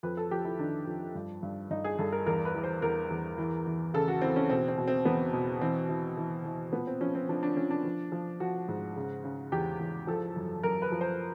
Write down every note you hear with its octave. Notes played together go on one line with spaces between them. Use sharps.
F2 B4
A4
F2 G4
E4
D#3 D4
F2
G2
G2
G2 D#4
G#4
G2 A4
A#4
E2 A#4
B4
E3
C5
E2 A#4
E2
E3
E3
C#3 A4
F#4
E3 C4
C#4
B2 C4
C4
B2
C4
E2 B3
B2
E3 C4
E3
E3
E3
A#2 B3
C4
F3 C#4
C4
F3 D4
D4
F3 C#4
D4
F3
F3
F3 F#4
G#2
C#3
C#3
E2 G4
E2
F3 A4
F#2
F#2 A#4
B4
F3
C5